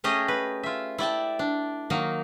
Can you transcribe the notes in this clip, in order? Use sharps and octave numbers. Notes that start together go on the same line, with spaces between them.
A3 C#4 G4 G#4 D#5
B4
F4 E5
E4 D5 G5 A5
D4
D#3 F#3 A#3 D#4